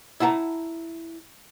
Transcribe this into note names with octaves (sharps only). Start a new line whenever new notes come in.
E4 F#5 A5 A#5